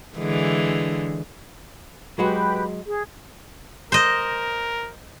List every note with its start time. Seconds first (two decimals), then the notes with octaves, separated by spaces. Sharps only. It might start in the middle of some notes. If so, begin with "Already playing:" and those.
0.18 D3 E3 G#3
2.18 F#3 G#3 F#4 G4 B4 B5
2.86 G#4
3.92 A#4 C5 D#5